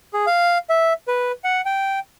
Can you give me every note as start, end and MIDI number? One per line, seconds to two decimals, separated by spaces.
0.13 0.26 68
0.27 0.58 77
0.69 0.93 76
1.08 1.32 71
1.44 1.61 78
1.65 1.99 79